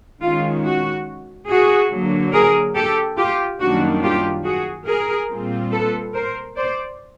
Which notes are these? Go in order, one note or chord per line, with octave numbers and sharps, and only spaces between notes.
D#3 G#3 C#4 F4
F#4
F#4 G#4
D3 F#3 A#3
G#4 A#4
G4 A4
F4 G4
F#2 D#3 G3 A#3 D4 F#4
F4 G4
F#4 G#4
G#4 A#4
A#2 G3 C4 F4
A4 B4
A#4 C5
C5 D5